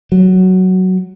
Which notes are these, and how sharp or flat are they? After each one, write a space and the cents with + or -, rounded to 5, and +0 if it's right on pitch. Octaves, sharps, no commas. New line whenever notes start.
F#3 +5